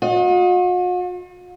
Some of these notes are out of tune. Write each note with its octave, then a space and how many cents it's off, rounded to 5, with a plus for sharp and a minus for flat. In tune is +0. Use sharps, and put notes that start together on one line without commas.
F#4 -45 D#5 +20